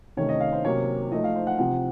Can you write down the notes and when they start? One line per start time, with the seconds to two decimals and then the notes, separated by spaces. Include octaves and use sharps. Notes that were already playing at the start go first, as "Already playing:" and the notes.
0.17 C3 D#3 A3 C#4 C#5
0.29 D#5
0.40 F5
0.53 C5
0.64 C3 F#3 A#3 C#4 C#5
1.12 F3 A3 D#4 D#5
1.24 F5
1.36 C5
1.47 F#5
1.59 C3 F3 C4 D#4 F#5